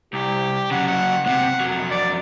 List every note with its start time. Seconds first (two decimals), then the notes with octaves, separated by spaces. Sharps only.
0.14 C2 G4
0.71 C#3 F#3 F#5
0.87 F#5
1.26 A2 C3 F#5
1.60 F2 F#3
1.91 D5